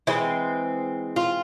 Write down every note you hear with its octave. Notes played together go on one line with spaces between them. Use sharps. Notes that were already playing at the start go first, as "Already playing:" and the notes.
E3 G#3 C4 E4
F4